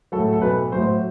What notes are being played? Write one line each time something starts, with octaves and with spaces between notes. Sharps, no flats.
A2 F#3 A4
A4
B1 B4
A2 F#3 C5